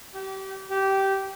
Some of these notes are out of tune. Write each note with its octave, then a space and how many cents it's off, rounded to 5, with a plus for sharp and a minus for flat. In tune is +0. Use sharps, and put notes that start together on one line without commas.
G4 -30
G4 -15